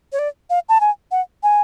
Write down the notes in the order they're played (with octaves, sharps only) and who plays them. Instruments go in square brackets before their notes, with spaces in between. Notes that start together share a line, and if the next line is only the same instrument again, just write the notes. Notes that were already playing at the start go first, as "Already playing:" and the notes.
[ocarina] C#5
D5
F5
A5
G#5
F#5
G#5